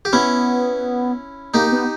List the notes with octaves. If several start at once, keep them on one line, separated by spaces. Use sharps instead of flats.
G4
B3 C#4 E4
A#3 D#4 G4
B3